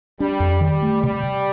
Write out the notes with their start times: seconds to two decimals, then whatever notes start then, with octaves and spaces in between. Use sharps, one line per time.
0.20 G3 D4
0.40 F2
0.61 D#3 G3
0.82 A3
1.02 C3 G3
1.23 C3